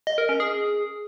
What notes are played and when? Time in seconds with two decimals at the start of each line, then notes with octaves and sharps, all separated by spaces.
0.07 D#5
0.18 A#4
0.29 C#4
0.40 G#4